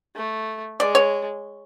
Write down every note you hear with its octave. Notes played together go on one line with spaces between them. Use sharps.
A3
G#3 D5
C#5